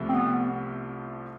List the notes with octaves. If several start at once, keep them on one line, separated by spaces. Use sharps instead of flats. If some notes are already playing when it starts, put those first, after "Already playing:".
Already playing: C2 C3 F3 A3
C4
B3